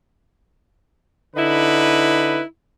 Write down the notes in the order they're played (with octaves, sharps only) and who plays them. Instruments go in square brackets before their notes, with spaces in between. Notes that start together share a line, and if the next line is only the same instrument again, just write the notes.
[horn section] D3 D#4 E4 B4